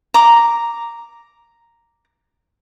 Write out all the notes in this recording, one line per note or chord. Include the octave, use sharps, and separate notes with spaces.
A#5 D6